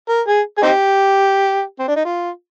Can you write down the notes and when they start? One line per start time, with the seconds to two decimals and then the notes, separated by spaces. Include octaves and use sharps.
0.09 A#4
0.28 G#4
0.58 G#4
0.62 C4 D#4 G4
1.79 C4
1.88 D4
1.96 D#4
2.05 F4